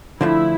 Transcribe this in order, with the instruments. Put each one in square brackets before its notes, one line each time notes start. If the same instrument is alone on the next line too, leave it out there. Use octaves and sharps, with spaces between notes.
[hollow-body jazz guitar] D3 F3 A3 [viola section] E4